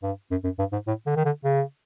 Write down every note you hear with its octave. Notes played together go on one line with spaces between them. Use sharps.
G2
F#2
F#2
G2
G#2
A2
D3
D#3
D3
C#3